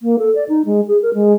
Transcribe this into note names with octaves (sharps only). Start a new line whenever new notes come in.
A#3
A4
D5
D#4
G#3
G#4
A#4
G#3